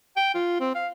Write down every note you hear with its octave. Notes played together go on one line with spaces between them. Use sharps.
G5
F4
C4
F5